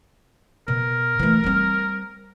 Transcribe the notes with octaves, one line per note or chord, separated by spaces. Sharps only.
B2 A#4
E3 A3
G3 C4